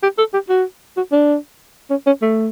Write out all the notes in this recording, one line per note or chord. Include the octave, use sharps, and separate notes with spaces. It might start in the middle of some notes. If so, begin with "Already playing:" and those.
G4
A4
G4
F#4
F#4
D4
C#4
C#4
A3